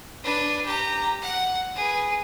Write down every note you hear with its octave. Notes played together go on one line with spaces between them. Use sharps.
D4 B4
G4 A#5
F#5
G#4 B4